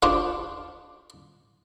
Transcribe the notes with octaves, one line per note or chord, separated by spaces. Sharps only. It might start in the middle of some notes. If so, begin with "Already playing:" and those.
D4 F4 C5 F5